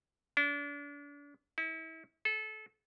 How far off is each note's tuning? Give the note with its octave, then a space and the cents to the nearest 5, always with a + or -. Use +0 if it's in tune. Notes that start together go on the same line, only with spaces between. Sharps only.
D4 -35
E4 -35
A4 -25